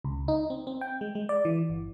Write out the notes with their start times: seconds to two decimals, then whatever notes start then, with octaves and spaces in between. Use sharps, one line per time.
0.04 C#2
0.28 D#4
0.50 C4
0.67 C4
0.81 G5
1.01 G#3
1.15 G#3
1.29 D5
1.45 E3
1.70 G1